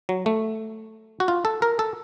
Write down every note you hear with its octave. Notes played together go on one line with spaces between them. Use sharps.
F#3
A3
F#4
F4
A4
A#4
A4